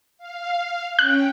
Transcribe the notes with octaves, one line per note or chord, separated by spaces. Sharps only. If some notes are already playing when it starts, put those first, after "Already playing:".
F5
C#4 G5 F#6